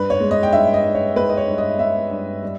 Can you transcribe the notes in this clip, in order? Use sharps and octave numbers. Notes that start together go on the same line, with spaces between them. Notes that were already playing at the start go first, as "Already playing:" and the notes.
Already playing: G2 B4
C#5
G#3
D#5
G5
G2 E5
D#5
G2
C#5
G#3 B4
D#5
C#5
G2
D#5
G#3 E5
G2
G3